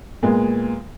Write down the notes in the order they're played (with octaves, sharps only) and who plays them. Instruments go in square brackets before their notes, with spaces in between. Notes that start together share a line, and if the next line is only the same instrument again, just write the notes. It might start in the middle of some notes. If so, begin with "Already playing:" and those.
[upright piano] A#2 G#3 B3